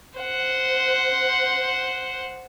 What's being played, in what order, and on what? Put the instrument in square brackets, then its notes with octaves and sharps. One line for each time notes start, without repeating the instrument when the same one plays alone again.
[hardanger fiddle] C5 F#5